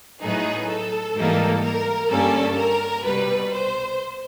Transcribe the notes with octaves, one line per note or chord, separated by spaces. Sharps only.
A2 F#3 B3 D#4 G#4
A4
G#2 E3 G3 A#3 D#4
A#4
G2 D3 G3 A#3 C#4 A4
A#4
C2 B2 G3 B4
C5